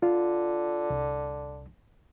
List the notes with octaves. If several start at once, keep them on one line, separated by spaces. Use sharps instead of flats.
D3 F4
C2